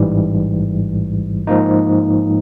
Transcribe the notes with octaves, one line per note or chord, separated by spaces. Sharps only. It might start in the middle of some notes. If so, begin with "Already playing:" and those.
Already playing: A1 G#2 E3 G3
G#2 F3 A#3 D#4